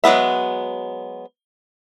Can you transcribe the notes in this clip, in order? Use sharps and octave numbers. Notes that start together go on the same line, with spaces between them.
F#3 G#3 B3 E5